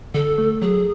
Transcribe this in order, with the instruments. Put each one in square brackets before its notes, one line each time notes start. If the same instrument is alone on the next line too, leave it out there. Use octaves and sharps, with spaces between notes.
[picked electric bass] D3 [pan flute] A4
[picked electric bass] A3
[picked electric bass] F#3 [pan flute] G#4